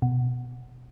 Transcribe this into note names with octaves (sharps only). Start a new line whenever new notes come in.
B2